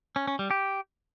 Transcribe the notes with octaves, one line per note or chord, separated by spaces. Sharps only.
C#4
C#4
G3
G4